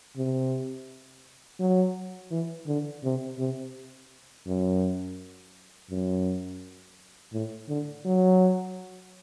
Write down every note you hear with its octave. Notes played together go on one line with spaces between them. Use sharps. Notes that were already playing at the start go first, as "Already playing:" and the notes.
C3
F#3
E3
D3
C3
C3
F#2
F#2
A2
D3
F#3